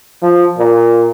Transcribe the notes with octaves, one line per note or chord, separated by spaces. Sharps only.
F3
A#2